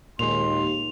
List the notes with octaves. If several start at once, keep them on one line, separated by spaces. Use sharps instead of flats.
D#2 A#2 G#3 C6 F7